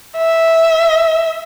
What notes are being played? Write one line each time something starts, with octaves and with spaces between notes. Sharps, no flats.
E5